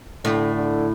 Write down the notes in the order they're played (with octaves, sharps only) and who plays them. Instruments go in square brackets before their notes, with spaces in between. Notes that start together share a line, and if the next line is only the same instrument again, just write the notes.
[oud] A2 [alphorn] D3
[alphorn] D3